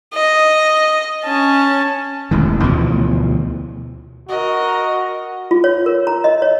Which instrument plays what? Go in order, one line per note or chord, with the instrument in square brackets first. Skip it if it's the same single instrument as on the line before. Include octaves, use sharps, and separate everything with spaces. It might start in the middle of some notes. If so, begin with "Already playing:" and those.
[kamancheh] D#5
C#4 A5
[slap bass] E1 A1 D#3
D2 B2 E3 F3
[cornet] F#4 [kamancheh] A#4 D#5
[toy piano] F4
C#5
A#4
A#5
D#5
C#5